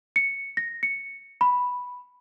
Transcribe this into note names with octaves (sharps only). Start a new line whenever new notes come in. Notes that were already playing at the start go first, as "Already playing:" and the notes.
C#7
A#6
C#7
B5